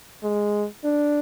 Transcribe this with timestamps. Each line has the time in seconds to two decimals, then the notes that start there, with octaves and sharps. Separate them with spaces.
0.23 G#3
0.84 D4